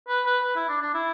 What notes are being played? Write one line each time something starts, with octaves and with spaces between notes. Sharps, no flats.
B4
B4
B4
E4
D4
D4
E4